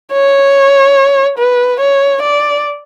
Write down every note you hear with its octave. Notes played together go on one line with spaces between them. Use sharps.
C#5
B4
C#5
D5